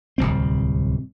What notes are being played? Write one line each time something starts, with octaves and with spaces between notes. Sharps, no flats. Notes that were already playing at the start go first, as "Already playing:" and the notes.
D1 G1 C2 C4